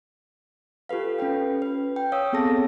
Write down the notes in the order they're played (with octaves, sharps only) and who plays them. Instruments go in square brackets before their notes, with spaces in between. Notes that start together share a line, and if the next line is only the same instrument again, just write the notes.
[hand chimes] F4 G4 A4 B4 F5
C#4 A4 B4 G5
B4
G5
C#5 F5 D#6 E6
B3 C4 G#4 A4 A5 A#6